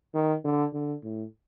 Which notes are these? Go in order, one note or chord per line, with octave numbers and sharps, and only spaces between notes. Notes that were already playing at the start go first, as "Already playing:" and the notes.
D#3
D3
D3
A2